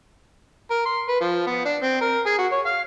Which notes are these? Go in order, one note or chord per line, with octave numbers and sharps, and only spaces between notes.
A#4
C6
B4
F3
B3
D4
C4
A#4
G#4
F#4
C#5
F5